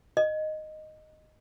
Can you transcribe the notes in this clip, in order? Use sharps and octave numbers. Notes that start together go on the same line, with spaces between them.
D#5